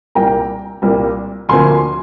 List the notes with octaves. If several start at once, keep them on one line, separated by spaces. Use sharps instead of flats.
C2 A#2 G3 A#3 G5 A#5
C2 A#2 G3 A#3
D2 D3 F3 A#3 G#5 C6